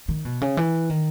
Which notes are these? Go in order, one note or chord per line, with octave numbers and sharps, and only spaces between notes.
D#3
B2
C#3
E3
D#3